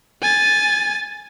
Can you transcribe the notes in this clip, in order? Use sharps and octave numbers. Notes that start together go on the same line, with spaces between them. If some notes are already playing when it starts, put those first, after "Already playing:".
G#5 A6